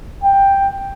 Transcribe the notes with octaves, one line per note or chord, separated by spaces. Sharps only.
G5